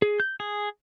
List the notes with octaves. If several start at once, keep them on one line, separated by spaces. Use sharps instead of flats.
G#4
G6
G#4